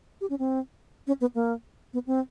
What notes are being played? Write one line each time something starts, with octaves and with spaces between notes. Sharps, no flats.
G4
C#4
C4
C#4
B3
A#3
B3
C4